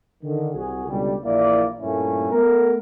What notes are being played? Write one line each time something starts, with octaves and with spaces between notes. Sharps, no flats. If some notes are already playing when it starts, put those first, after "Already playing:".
D3 D#3
C2 F#4 G#4
C#2 B2 D3 G3
A#1 E3 A#3 E4 D5
G2 A#2 A3 A#3 C#4 E4
A3 B3 A#4